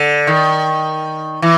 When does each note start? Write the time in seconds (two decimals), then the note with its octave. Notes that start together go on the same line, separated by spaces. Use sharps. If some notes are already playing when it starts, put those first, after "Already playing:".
Already playing: D3
0.27 D#3
1.42 E3